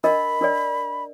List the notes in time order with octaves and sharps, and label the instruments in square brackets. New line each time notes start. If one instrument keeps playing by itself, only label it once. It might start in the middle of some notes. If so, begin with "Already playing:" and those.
[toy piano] D4 A#4 D#5 [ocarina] B5
[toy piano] D4 A#4 D5